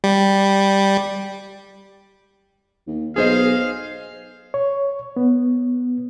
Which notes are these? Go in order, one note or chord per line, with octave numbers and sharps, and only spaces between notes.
G3
D#2
B1 G#4 C5 D#5 F5
C#5
B3